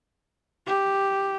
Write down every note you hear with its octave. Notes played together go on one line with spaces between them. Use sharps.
G4